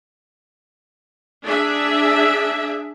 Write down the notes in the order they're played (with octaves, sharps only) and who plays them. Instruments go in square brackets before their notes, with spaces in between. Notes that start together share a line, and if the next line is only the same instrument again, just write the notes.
[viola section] D4 G#4 E5